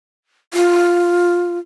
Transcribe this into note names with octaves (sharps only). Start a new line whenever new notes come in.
F4